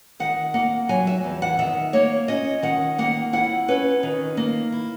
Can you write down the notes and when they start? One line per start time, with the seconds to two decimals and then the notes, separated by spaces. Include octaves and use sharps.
0.20 D#3 F#5
0.54 A#3 F#5
0.89 F#3 G#5
1.07 E5
1.24 E2
1.42 F#5
1.59 D#3 E5
1.93 A#3 C#5
2.28 C#4 D#5
2.63 D#3 F#5
2.98 A#3 F#5
3.33 E4 F#5
3.68 C#4 B4
4.03 D#3
4.37 A#3
4.72 E4